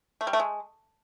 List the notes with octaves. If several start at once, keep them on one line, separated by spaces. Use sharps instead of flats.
A3
G3
A3
G#3